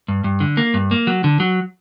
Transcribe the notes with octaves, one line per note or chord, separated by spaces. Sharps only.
G2
G2
D3
A#3
G2
A#3
F#3
D3
F#3